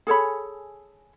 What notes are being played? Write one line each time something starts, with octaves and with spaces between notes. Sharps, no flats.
G#4 A4 C#5 B5